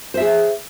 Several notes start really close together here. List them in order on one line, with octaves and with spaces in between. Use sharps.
C5 E5 G#4